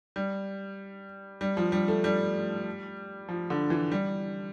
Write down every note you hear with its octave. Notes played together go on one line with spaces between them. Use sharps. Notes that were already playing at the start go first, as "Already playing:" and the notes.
G3
G3
F3
G3
A3
G3
F3
D3
E3
G3